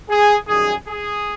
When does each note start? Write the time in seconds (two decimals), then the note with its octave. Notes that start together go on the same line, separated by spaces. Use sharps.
0.10 G#4
0.48 F#2 D#3 G3 G#4
0.85 G#4